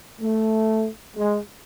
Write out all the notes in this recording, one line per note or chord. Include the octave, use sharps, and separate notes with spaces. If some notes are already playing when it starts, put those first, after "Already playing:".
A3
G#3